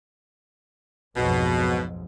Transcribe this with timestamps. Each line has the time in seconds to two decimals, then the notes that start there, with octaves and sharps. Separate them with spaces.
1.17 B1 F2 G#2 B2